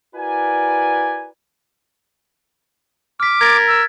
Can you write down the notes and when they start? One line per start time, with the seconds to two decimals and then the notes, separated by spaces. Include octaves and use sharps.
0.16 E4 F#4 A#4 B4 D5 G#5
3.20 D6 F6 B6
3.41 A#4 G#6 A6
3.67 E6